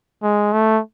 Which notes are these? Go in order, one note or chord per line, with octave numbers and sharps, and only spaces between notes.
G#3
A3